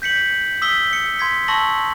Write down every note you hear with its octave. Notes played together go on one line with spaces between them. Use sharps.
G6 B6 C#7 F#7
D#6 E6 B6 G7
C#7
C6 G#6 B6
A5 C6 C#6 E6 A#6 F#7